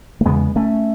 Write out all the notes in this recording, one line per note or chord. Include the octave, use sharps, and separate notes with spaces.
A3
E2 C#3 G#3 B3
A3 C#4